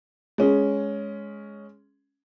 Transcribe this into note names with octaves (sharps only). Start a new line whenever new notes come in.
G#3 C#4 G#4